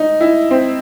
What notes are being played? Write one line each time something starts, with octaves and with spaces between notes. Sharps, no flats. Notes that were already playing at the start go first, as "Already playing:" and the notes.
Already playing: D#4
E4
C4